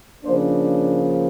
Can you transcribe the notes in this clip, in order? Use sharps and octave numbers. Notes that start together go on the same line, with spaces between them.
C#3 F3 A#3 D4 C5